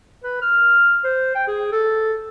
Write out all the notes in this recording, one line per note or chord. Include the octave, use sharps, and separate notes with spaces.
B4
F6
C5
G5
G#4
A4